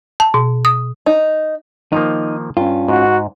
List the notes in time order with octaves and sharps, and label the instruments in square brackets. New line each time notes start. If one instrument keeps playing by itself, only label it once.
[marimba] A5
B2
D#6
[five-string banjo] D#4
[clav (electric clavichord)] D#3 F3 A#3 [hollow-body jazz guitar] D#4
[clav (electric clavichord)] G2 [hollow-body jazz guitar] C#4 F4
[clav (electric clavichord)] G#2 [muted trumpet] F#4